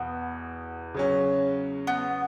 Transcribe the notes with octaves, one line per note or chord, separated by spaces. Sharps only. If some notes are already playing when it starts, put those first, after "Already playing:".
Already playing: E2 B2 B3
C#3 F#3 C#4
B3